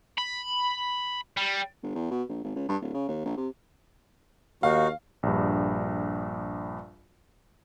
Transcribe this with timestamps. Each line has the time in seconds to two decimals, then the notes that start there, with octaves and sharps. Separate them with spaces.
0.18 B5
1.37 G3
1.83 G1
1.95 E2
2.11 B2
2.29 A#1
2.44 G#1
2.55 C#2
2.69 G2
2.81 D1
2.94 C#3
3.08 D#2
3.25 A#1
3.37 C3
4.63 D#2 D#4 F#4 F5
5.23 A#1 G2